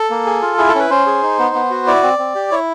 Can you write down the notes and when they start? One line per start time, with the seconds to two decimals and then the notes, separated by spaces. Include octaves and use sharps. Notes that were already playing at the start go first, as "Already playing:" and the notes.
Already playing: A4
0.10 A#3
0.26 G#4
0.42 F4
0.58 E4 G#4
0.69 A4
0.75 C#4 B4
0.90 C#4 C5
1.06 G#4
1.23 D#4
1.39 B3
1.55 B3
1.70 F#4
1.87 E4 D5
2.03 C4
2.18 C4
2.35 G4
2.51 E4 C#5